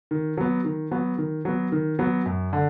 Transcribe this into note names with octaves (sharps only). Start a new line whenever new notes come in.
D#3
F#3 B3
D#3
F#3 B3
D#3
F#3 B3
D#3
F#3 B3
F#2
D3